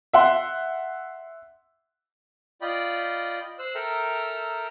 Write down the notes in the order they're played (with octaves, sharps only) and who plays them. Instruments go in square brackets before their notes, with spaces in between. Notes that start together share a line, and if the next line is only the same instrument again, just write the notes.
[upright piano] E5 F#5 C6
[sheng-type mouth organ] F4 D5 D#5 G5 B5
C5 E6 F#6
A4 A#4 E5 G5 A#5